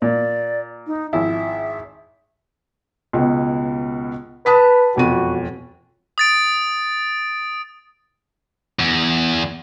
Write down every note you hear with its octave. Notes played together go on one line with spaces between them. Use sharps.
A#2 D5
D#4
G#1 F3 E4 E5
C#2 B2
B4 A5 D#6 B6
E1 F2 F#4 D#7
D#6 A6 D7
E2